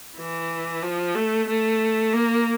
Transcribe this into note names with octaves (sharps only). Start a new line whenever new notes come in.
E3
F3
A3
A3
A#3